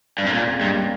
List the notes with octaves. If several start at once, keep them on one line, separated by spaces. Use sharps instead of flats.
G2
G#2 C4
A#2 A#3 C#4
G#3 C4
G2 G3 A#3
A#3 C#4